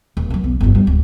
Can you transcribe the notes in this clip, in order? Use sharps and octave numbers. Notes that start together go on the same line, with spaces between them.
D#1
F#3 C#4
B1
G1 F2
G3
D1